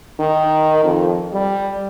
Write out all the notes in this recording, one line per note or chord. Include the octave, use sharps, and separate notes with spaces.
D#3
F2
G3